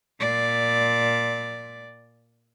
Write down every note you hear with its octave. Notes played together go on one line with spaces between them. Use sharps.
A#2 D5